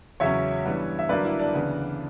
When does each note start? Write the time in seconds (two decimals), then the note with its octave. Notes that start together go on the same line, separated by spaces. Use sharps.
0.20 E2 C#3 F#3 C#4 C#5 E5
0.65 G2 E3 G3 B3
0.99 E5
1.09 G2 D3 F#3 A#3 B4 D5
1.25 E4
1.39 D4
1.54 D2 C#3 E3 B3